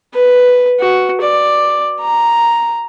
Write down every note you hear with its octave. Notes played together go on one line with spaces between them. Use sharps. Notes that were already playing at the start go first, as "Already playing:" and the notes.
B4
F#4
D5
A#5